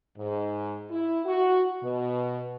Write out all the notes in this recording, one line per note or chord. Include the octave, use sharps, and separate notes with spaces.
G#2
E4
F#4
B2